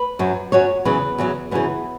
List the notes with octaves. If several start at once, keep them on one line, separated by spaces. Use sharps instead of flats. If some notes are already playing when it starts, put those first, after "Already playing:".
Already playing: B4
F#2 F#3
F#2 F#3 C#5
E2 C#3 F#3 B4
E2 C#3 F#3
F#2 C#3 E3 B3